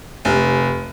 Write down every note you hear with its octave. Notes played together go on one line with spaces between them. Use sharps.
F1